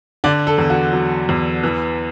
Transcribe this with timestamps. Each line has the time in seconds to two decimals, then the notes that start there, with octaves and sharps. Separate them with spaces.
0.24 D3 D5
0.47 A4
0.58 E2
0.70 F#4
0.93 F#3
1.29 E2
1.64 E3